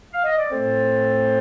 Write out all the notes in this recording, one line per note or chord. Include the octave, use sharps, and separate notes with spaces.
F5
D#5
D5
A2 A3 C4 A4 C5